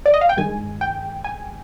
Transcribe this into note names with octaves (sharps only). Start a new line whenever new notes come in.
D5
D#5
F5
G5
G2 D#3 G#3 G#5
G5
G#5